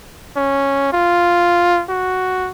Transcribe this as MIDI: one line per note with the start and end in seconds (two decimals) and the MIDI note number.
0.37 0.91 61
0.92 1.83 65
1.89 2.51 66